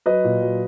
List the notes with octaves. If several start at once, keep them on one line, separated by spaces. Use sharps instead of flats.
F#3 B4 D#5
A#2
F#3